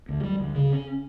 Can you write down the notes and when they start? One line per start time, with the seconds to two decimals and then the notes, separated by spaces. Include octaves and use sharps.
0.09 D2
0.24 G3
0.40 D2
0.55 C#3
0.70 C#4